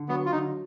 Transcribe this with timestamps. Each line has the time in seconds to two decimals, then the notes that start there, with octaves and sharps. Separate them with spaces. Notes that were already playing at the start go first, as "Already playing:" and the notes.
Already playing: D3
0.09 F#3 B3
0.25 F4
0.32 D3 D#4